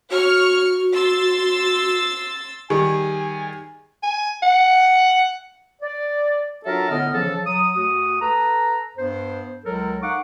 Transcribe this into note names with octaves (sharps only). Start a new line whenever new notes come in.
F#4 C#5 C#6 F6
C6 E6 A6
D#3 G3 G#4 G#5
G#5
F#5
D5
F#3 D4 F4 A4 A#4 E5
A2 D3 B3 D#5 F6
C#3 E3 F3 A4
F#3 D#6
D2 F#4 D#6
A4 B4 A#5
G2 B3 C5
C#2 F#3 A4 A#4
D#4 F5 F#5 C#6 D6